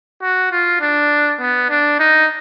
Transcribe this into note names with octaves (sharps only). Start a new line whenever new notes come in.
F#4
F4
D4
B3
D4
D#4